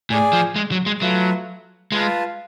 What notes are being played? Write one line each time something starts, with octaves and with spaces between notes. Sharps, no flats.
A2 G#4 D5 G#5
F3
G#3
F#3
G#3
F#3 A3 F4 B4
G#3 F4 B4 F5 A5